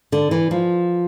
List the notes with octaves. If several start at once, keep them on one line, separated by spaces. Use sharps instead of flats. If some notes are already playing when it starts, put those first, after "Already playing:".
D3
E3
F3